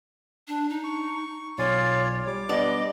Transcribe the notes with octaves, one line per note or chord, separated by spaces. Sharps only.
D4
D#4
C#6
B1 F4 C#5 D5 F5 G#5 C6
G3 D6
G3 B3 D4 D5 D#5